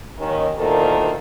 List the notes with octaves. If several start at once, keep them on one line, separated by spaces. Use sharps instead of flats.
D#2 D#3 C#4
D2 A#2 D#3 A#3 A4 C5